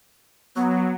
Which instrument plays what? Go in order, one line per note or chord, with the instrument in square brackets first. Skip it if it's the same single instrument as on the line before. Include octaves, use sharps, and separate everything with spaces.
[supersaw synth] F#3 [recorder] B3